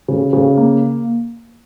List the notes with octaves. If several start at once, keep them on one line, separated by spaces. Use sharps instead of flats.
C#3
C#3
A#3